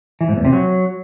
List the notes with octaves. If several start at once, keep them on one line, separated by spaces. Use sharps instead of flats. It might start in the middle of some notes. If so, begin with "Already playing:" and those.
E3
G#2
E2
C3
F#3